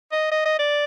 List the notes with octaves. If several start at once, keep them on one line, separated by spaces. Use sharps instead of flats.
D#5
D#5
D#5
D5